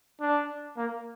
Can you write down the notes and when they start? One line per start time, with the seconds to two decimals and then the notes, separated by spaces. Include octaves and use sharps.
0.20 D4
0.77 A#3